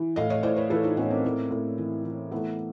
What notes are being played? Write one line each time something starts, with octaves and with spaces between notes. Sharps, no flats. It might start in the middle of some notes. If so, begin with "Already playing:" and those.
Already playing: E3
A2 D#5 F5
C#5 D#5
A2 C5 D5
B4 C#5
E3 A4 B4
D#4 F4
A2 B3 C#4
A#3 C4
A2
A2
E3
E3
E3 A3 B3